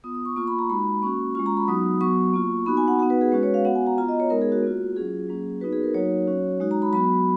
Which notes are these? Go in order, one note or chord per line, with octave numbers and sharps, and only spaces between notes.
B3 F4 D#6
D#6
C#6
A#3 F4 C#6
B5
A#5
G#3 D#4 F#4 B5
A#3 C#4 F#4 C#6
G#3 C#4 F4 C#6
A#5
B5
F#3 B3 D#4 F#4 D#6
F#3 B3 F#4 C#6
A#3 F4
B3 D#4 F#4 B5
G#5
F#5
B3 D#4 F#4 F#5
B4
G#4
G#3 C#4 F#4 B4
C#5
F5
B3 F#4 F#5
G#5
A#5
B3 F4 A#5
D#5
C#5
G#3 B3 D#4 A#4
G#4
F#4
A#3 F4
F#3 C#4 F4 G#4
F#3 A#3 C#4
B3 D#4 F#4 B4
G#4
A#4
F#3 A#3 D#4 F#4 C#5
F#3 C#4 F#4
G#3 D#4 F#4
A#5
B5
F#3 B3 F#4 B5